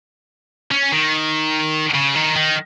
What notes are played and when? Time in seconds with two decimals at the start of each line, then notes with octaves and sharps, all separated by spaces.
0.71 C#4
0.92 D#3
1.95 C#3
2.15 D#3
2.36 D#3